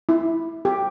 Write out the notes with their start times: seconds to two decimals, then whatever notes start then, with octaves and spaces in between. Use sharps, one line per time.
0.09 E4
0.65 G4